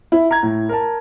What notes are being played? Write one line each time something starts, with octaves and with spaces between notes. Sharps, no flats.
E4
A#5 G#6
A2
A#4 A5